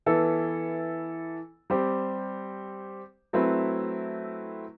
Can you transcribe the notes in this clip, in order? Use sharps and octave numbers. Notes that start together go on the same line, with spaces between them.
E3 B3 E4 A4
G3 C4 G4 C5
F#3 A3 C4 E4 B4